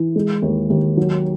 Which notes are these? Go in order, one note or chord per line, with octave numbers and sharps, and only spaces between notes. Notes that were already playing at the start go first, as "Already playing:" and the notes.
Already playing: E3
G#3
D#2
D#2
F#3